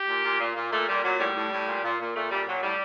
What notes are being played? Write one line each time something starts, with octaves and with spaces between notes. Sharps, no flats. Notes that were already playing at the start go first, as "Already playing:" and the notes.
Already playing: G4
A#2
A#2
A#2
A#2
A#2 A3
A#2 G3
A#2 F#3
A2 G3
A2
A2
A#2
A#2
A#2
A#2 A3
A#2 G3
A#2 F#3
A2 G3